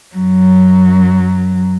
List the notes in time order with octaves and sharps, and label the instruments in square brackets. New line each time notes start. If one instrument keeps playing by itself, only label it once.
[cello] F#2 F#3